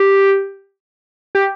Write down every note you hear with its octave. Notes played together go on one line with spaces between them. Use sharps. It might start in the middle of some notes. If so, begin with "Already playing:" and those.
Already playing: G4
G4